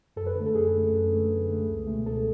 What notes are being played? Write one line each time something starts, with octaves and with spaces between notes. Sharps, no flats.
F#2 A4
B4
D3 A3
A4
F#2 G#4
D3 A3
F#2
D3 A3
F#2
D3 A3
C#2
B2 A3
C#2 A4